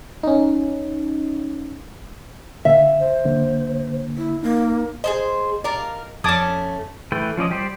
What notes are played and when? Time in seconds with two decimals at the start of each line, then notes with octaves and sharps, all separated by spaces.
0.23 C#4 D#4
2.65 D3 E5 F5
3.00 C5
3.25 D3 A#3
4.17 E4
4.43 A#3 D#4
5.04 G#4 A4 C5 D#5
5.64 A#4 D5 F5
6.24 F2 A3 C#4 A5 D6 D#6 G#6
7.12 E3 A3 A4 B4 G5
7.37 F3 C#4 D5 D#5
7.51 G3 G4 C5 D5